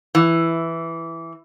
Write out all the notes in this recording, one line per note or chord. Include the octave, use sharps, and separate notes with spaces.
E3